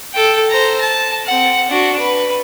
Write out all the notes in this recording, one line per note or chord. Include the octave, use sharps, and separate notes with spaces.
A4 G5
C5 A#5
A5
C4 F#5
D4 F#4
B4